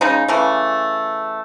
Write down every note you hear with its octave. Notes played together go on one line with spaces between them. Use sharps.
C#3 G#3 D#4
C#3 E3 A3